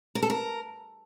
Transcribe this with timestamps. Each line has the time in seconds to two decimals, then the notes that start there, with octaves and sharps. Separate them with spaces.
0.15 A#4
0.23 A4
0.30 A#4